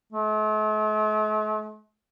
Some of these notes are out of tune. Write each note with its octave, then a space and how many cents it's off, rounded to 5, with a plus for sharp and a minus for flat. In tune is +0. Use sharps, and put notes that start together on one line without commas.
A3 -45